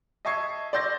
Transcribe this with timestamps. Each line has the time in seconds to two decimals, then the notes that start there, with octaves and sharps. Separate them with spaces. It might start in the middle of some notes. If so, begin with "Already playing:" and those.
0.25 D#5 E5 A5 C#6 G#6 C7
0.73 D5 C6 E6 G6 A6 A#6